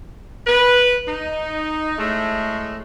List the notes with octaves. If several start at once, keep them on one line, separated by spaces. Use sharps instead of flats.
B4
D#4
A2 G#3 A3